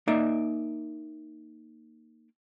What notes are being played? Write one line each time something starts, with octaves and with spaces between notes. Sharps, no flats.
A#3 D#4 D5 E5